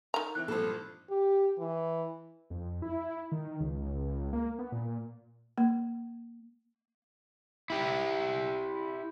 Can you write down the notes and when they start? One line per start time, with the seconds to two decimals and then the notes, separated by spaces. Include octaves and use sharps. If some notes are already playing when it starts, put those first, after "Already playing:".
0.14 D#3 A#5
0.35 E3 C4 E4 F#6
0.48 G#1 G2 A#2 F3 A4
1.10 G4
1.58 E3
2.50 F2
2.82 E4
3.32 D#3
3.60 C#2
4.33 A#3
4.59 B3
4.72 A#2
5.58 A#3
7.70 E4 G4